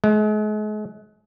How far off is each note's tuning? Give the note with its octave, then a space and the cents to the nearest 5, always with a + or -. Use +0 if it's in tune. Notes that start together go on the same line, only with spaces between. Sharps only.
G#3 +40